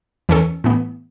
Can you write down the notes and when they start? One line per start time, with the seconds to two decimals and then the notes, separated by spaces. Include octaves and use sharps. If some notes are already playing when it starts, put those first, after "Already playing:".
0.29 E2 E3 C#4 A4
0.64 A2 E3 B3